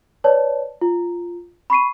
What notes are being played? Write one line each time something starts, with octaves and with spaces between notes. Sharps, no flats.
B4 C#5 D5 A5
F4
B5 C#6 C7 D#7